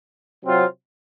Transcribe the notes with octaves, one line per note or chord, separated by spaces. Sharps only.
C3 F#3 C4 F4